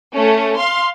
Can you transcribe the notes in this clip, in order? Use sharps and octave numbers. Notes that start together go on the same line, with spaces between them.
A3 C#4
F5 C6